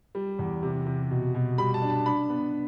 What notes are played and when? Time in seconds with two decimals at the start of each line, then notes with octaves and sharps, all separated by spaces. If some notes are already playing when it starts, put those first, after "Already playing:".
0.15 G3
0.39 E2
0.63 C3
0.86 C3
1.11 B2
1.34 B2
1.58 G3 B5
1.74 A5
1.82 D4
1.90 A5
2.06 D4 B5
2.30 B3